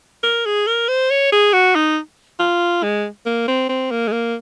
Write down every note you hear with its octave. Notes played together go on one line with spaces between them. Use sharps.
A#4
G#4
A#4
C5
C#5
G#4
F#4
D#4
F4
G#3
A#3
C4
C4
A#3
G#3
A#3